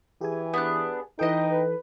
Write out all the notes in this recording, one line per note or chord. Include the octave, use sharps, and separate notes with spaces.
E3 G4 G#4 G#5
B3 D4 F#6
E3 D#4 A4 B4 D#5 G5 D#6
B4